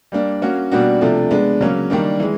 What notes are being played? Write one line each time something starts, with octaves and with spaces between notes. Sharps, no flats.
G3 A#3 D4
A#3 C#4 F#4
B2 G3 A#3 D4 F#4
C3 F3 A3 D4
G#3 B3 D4
C#3 F#3 A#3 C#4
D#3 G3 A#3 D4
E3 G#3